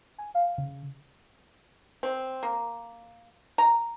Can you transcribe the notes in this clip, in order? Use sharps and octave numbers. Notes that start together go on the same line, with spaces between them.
G#5
F5
C#3
C4
A#3
A#5